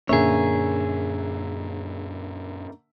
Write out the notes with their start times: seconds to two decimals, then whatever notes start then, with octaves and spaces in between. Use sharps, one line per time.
0.09 F#2 A#2 D3 A#3 C#4 G#4 C#5 E5